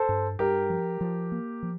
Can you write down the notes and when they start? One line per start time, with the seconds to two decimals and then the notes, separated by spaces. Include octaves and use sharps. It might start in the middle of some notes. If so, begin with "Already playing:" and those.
Already playing: A4 C5
0.09 G2
0.39 G2 G4 A#4
0.70 F3
1.01 F3
1.32 A#3
1.63 F3